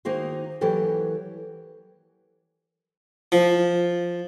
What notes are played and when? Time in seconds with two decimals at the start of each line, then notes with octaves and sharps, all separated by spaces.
0.05 D#3 A#3 D#4 F#4 G#4 C5
0.61 E3 F#3 A#3 G4 A4 A#4
3.32 F3